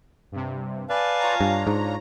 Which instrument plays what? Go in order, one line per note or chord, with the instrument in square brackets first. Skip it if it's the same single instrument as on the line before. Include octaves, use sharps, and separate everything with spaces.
[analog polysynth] G2 C3
[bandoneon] B4 D5 [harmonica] F5 G#5 A5
[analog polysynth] F4 C#5 A#5
[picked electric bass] G2 [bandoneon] D4
[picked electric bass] G#2